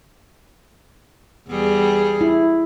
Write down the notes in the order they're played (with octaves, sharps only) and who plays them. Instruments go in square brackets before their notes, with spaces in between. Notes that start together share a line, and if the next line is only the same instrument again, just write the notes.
[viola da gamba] E2 G3 G#4
[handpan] E4